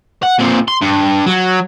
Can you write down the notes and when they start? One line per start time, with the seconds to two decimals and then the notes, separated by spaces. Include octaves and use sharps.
0.23 F#5
0.39 A#2 C4
0.68 C6
0.82 G2
1.26 F#3